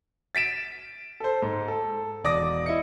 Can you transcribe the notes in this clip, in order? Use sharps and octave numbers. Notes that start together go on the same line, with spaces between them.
A6 B6 D7 E7
A4 C5
G#2
A4
E1 D5 D6 D#6 A#6
E4 D#5 E5 C#7